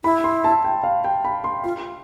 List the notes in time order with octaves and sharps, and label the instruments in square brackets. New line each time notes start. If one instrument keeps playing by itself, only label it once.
[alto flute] E4 [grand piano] B5
[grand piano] C6
A5
G5
F5
G5
B5
C6
[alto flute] F4 [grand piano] C6